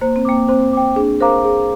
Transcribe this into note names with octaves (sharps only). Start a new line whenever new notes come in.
A#3 C5
C4
A#3 G5 D6
C4 C5
G5 D6
D4 G#4
A#4 C5 F5 A#5 D6
G#4